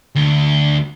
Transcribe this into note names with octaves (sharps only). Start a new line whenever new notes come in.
D2